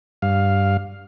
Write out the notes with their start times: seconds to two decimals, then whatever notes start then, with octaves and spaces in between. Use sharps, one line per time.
0.22 G2 F5